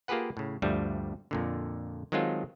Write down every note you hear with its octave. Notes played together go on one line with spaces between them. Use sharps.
A#3 F4 G4 G#4 B4 F#5
A2 C#3
D2 G2 F3 G3 A3
F2 A#2 D3
D#3 F#3 G#3 C4 F4 A4